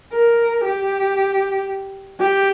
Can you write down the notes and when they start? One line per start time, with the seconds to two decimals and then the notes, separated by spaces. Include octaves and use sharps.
0.13 A#4
0.65 G4
2.20 G4